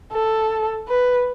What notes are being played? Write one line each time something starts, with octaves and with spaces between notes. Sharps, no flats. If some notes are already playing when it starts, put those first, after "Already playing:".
A4
B4